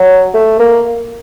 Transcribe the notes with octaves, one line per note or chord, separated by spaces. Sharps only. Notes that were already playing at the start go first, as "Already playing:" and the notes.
Already playing: F#3
A3
A#3